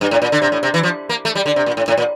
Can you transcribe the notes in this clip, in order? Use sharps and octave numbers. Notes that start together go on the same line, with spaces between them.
G2
A2
A#2
D3
C3
A2
C3
E3
F3
A#3
A3
G3
D3
C3
A#2
A2
A2
A#2